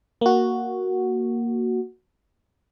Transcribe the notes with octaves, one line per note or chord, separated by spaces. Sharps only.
A#3 F#4